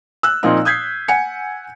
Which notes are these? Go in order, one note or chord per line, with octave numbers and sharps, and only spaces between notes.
E6 F#6
A#2 F3 A#3 C4 D#4
D#6 G6 G#6 B6 C7
F#5 G#5 C#7